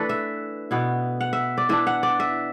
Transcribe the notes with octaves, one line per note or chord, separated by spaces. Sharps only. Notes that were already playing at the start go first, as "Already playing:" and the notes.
Already playing: E3 A3 D4 A4 B4
E5
B2 B3 E4
F#5
E5
D5
E3 D4 E5
F#5
D5
E5